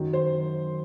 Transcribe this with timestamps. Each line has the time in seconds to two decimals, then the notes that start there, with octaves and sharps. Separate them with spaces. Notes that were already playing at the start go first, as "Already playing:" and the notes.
Already playing: F#2 D#3 F#3
0.13 C5